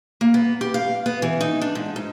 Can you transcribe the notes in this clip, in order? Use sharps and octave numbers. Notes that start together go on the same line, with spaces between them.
A#3
B3
G4
F5
B3
E3
D#4
D4
G#2
G#2